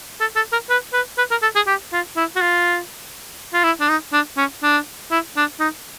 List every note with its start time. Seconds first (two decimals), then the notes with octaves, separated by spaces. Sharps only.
0.21 A4
0.36 A4
0.53 A#4
0.70 B4
0.93 B4
1.18 B4
1.31 A#4
1.43 A4
1.56 G#4
1.67 G4
1.93 F4
2.17 E4
2.36 F#4
2.41 F4
3.54 F4
3.64 E4
3.80 D4
3.89 D#4
4.13 D4
4.37 C#4
4.63 D4
5.11 E4
5.37 D4
5.60 D#4